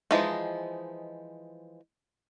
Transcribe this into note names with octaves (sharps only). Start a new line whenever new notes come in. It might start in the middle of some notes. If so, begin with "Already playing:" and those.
E3 F3 G#3 D#4